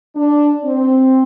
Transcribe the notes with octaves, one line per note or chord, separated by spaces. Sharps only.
D4
C4